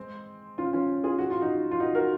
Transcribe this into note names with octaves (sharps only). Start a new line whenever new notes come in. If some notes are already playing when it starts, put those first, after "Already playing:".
Already playing: G#3 C4
C#4 F4
C#4 F4
F4 G#4
F#4
F4
D#4 F#4
F4
D#4 F#4
F#4 A#4